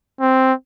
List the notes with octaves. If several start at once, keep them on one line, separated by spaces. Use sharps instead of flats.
C4